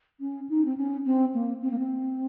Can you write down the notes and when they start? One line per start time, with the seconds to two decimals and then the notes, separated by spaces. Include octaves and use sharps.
0.20 C#4
0.49 D#4
0.65 C4
0.77 C#4
1.05 C4
1.34 A#3
1.62 C4
1.71 A#3
1.79 C4